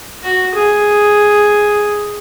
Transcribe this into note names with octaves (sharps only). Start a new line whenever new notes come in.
F#4
G#4